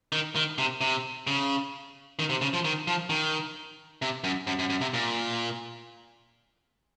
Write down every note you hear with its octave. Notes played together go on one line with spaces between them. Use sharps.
D#3
D#3
C3
C3
C#3
D#3
C3
C#3
F3
D#3
F3
D#3
C3
F#2
F#2
F#2
F#2
C3
A#2